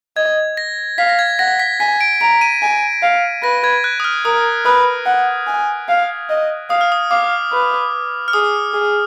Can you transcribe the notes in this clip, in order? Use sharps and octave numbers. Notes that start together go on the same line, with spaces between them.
D#5 G#6
A#6
F5 B6
A#6
G#6
F#5 A#6
B6
G#5 B6
D7
A#5 D7
D#7
G#5
F5
B4 A#6
G#6
F#6
D#6
F6
A#4 D#6
B4 D#6
F#5
G#5
F5
D#5
F5 D#6
F6
D#6
F5 D6
B4
F6
G#4 D#6
G#4